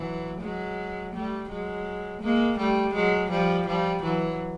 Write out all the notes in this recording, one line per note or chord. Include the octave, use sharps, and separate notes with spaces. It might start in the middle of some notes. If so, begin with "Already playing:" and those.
Already playing: E3 F#3
F#3 G#3
G3 A3
F#3 G#3
G#3 A#3
G3 A3
F#3 G#3
F3 G3
F3 G3
E3 F#3